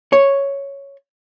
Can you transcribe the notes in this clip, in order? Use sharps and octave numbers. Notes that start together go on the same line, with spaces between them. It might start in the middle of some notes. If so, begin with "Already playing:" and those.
C#5